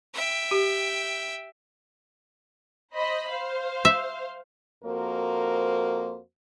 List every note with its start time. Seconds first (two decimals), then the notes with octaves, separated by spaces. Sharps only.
0.14 E5 G5
0.51 G4
2.93 C5 D#5 B5
3.29 C5 F5
3.85 E5
4.84 F2 A#3 F#4 A#4 C5